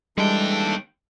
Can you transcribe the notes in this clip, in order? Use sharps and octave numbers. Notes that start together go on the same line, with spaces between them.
D#2 E3 G3 G#3 D4 A4 G5